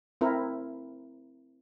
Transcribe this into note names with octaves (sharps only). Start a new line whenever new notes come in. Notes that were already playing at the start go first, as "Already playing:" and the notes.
C4 E4 A#4